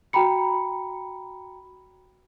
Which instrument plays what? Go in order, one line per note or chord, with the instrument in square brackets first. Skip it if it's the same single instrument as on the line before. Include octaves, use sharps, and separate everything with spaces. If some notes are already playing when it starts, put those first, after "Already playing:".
[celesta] F#4 G5 A#5 B5 C#7